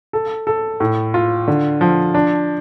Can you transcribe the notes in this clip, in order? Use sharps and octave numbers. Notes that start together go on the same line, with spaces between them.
A4
A4
A2
F4
D3
F3
D4